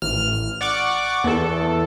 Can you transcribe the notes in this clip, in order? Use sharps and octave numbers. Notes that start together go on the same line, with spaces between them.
A1 F6
D5 F#5 C#6 D6
E2 A4